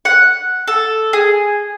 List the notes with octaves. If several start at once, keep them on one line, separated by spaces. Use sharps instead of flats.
F#5
A4
G#4